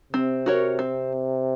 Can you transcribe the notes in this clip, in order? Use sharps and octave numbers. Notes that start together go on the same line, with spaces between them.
C3 C4
F#4 A#4 C#5
C4